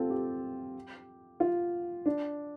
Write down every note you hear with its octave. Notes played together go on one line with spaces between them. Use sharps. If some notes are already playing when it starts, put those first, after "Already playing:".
Already playing: C4 F4 A4
G4
F4
D4